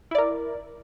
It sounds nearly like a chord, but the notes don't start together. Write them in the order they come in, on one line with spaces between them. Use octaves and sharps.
E4 D5 A#4